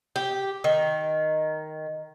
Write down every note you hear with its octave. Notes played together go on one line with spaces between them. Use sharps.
G4
D#3